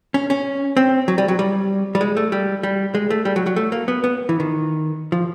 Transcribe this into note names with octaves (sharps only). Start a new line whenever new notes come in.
C#4
C#4
C4
F#3
G3
F#3
G3
G3
G#3
A3
G3
G3
G#3
A3
G3
F#3
F#3
A3
A#3
B3
B3
E3
D#3
F3